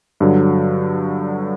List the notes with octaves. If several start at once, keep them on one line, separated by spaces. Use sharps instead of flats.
G2 D3 F#3